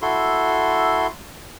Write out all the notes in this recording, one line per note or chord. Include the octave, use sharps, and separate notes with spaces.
E4 F#4 A4 C6